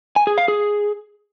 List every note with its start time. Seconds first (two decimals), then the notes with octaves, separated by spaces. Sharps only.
0.16 G#5
0.27 G#4
0.38 F5
0.48 G#4